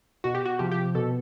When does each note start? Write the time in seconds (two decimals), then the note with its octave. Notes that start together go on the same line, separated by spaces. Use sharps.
0.24 B2 F#4
0.35 G4
0.45 F#4
0.59 C3 F3 G4
0.71 G4
0.95 B2 A4